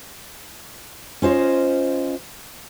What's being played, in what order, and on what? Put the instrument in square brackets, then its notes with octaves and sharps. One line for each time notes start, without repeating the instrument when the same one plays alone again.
[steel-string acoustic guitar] C#4 F4 C5 D#5